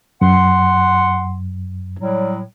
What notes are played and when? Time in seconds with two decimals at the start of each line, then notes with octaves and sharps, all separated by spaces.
0.21 F#2 F#5 C6
1.98 A2 F#3 G3